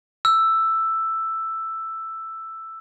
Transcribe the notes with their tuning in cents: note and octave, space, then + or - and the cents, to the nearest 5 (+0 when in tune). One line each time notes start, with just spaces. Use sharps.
E6 +5